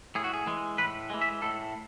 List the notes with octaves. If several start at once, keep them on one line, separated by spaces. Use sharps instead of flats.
A2 G#4
F#4
G#4
E3 G#3
A2 B4
E3 G#3
E5
A2 A4